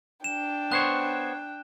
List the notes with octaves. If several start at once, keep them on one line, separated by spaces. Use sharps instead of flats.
D4 G5 E7
B3 C5 C#5 F#6